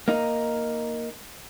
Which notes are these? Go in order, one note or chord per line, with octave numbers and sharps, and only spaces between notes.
A#3 D#4